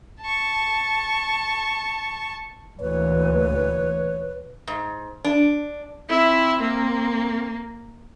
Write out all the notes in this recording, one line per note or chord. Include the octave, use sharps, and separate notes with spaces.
A5 C#6
D2 A#2 E3 B4 C#5
G#2
D4
C4 E4 E5
A#3